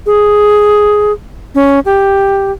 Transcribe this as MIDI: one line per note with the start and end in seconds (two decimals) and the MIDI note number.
0.06 1.12 68
1.55 1.80 61
1.86 2.52 67